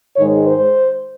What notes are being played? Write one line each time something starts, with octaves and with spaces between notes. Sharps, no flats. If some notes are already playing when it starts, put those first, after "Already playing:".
G#2 D#3 G#3 C#5
C5